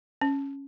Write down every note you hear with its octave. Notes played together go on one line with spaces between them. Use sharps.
C#4